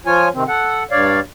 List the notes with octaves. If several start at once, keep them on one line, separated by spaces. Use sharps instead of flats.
F3 F4 C#5 G#5
C3 D#3 C4
A4 F#5
G2 C#5 D5 F5